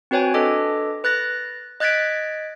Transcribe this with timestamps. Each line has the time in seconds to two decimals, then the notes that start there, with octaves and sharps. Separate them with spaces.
0.11 C4 F#4 B4 C#5 G5 G#5
0.34 D4 A4 B4 D#5 D6
1.04 B4 F#6 A6 A#6
1.80 D#5 F#6 G#6 A6 B6 D7